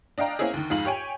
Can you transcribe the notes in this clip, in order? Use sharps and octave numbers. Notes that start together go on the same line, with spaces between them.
D4 D#5 F5 G5 A#5
A#3 C4 C#4 E4 G#4
D2 D#3
F2 G#2 D#4 F5 F#7
G4 C#5 G5 G#5